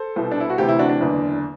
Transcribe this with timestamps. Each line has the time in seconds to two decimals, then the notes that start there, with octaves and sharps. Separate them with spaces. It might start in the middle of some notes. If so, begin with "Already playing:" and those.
Already playing: A4 C5
0.16 C2 B2
0.31 D4
0.40 E4
0.50 F#4
0.58 D2 C3 E3 E4 G4
0.68 E4
0.79 D4 F#4
0.89 D4
1.00 F#1 E2 D3